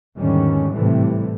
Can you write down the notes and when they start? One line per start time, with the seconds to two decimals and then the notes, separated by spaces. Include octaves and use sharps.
0.17 E2 G#2 D3 D#3 G3 C#4
0.72 G#1 A2 C3 E3 G3 A3